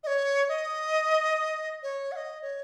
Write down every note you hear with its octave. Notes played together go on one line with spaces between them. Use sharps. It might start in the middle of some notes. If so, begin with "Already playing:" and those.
D#5
C#5
D#5
C#5
F#5
D#5
C#5